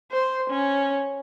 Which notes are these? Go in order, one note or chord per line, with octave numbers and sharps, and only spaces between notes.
C5
C#4